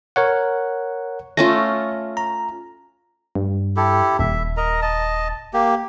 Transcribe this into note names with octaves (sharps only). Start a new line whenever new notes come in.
A#4 C#5 F#5
A3 C#4 F4 A#6
A#5
G2
E4 G4 A4
D#1 E5
A#4 D#5 A#5
D#5 A5
A#3 G4